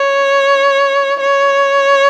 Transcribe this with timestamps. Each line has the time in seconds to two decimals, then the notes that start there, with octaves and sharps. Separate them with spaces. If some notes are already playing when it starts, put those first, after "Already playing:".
Already playing: C#5
1.21 C#5